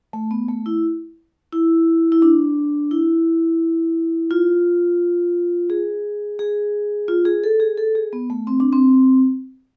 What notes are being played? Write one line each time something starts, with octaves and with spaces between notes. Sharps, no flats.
A3
B3
A3
E4
E4
E4
D4
E4
F4
G#4
G#4
F4
G#4
A4
G#4
A4
G#4
B3
A3
C4
D4
C4